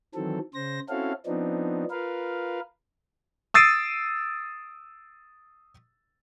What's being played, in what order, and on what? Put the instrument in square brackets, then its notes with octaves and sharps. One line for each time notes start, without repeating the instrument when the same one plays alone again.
[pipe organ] D#3 E3 F#3 C4 A4
C#3 C5 A#6
C4 C#4 E4 F#4 A4 F5
F3 B3 C4 D4 D#4
F4 A#4 B4 F5
[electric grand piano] D#6 E6 A6 C7 D7 D#7